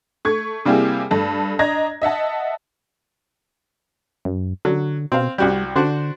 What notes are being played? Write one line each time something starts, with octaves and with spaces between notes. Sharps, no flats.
A3 C#6 G#6
C3 G3 A#3 E4 G4 G#4
G2 A3 A5
D4 D#5 A#5 G#6 A#6
D#5 E5 F#5 A5
F#2
D3 F#3
B2 C4 F5
C2 G3 F#4 G4
D3 D4 F#4 C5